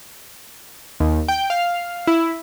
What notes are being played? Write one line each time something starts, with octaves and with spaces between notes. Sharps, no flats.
D#2
G5
F5
E4